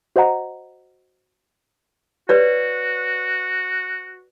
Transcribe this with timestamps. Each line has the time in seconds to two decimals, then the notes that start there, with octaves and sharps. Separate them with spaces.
0.16 F#4 C5 D#5 F#5 A#5
2.29 F#4 B4 C#5 D5